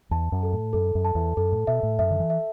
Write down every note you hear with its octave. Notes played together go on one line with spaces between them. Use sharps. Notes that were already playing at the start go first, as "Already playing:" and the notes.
E2 A5
F#2
A4
A2
F#2 A4
F#2
A5
E2
F#2 A4
A2
B2 E5
A2
F#2 E5
D3
E3
E5